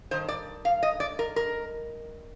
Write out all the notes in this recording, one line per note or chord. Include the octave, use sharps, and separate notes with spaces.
G2 D#3 C5
D5
F5
D#5
D5
A#4
A#4